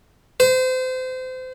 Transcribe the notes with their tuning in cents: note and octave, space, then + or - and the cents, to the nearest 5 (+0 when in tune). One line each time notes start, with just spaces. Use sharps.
C5 -30